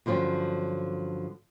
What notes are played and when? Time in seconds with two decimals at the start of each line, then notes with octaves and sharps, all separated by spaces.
0.06 G2 D3 F3 F#3 C#4